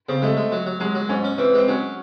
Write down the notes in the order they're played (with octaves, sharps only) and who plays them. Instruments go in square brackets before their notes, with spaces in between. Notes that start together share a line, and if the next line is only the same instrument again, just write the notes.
[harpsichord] C#3 [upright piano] C4
[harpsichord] G#3 [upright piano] A3
[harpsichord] G#3
F#3
F#3
[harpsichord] F#3 [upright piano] G#3
[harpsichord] F#3
[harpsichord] G#2 [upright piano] C#4
[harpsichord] C#4
[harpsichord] E3 [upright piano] C4
[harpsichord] G#3 [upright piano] C4
[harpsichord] F#3 [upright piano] C#4